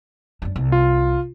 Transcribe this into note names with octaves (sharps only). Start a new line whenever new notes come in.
F#2 D4
C2
F4